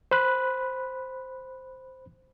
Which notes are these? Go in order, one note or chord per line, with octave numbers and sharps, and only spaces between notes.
C5 B5 F#6